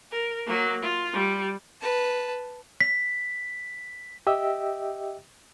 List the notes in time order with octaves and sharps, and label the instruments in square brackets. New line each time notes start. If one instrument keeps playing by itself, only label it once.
[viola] A#4
F#3 A#3
F4
G3
[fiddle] B4 A5
[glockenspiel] B6
[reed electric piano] G4 D#5 E5 G5 E6